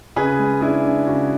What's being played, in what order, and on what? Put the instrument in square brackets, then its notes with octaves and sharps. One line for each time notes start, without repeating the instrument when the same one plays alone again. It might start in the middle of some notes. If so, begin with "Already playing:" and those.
[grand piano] C#3 G#4 B4
G#3
D4 E4 G#4
D4
C#3 F#4